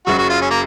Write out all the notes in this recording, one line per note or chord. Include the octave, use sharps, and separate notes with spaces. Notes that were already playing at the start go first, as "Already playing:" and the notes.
F#1 F#2 C#3 F#3 F#4
F#4
F4
C#4
A#3